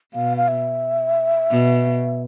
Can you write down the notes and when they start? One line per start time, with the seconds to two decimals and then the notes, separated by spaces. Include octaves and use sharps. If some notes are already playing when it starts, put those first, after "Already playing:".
0.14 B2 F5
0.37 F5
0.48 E5
1.51 B2